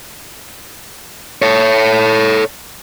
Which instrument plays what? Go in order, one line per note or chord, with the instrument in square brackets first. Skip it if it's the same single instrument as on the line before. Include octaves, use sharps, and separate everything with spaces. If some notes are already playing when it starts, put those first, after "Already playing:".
[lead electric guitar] A4 C#5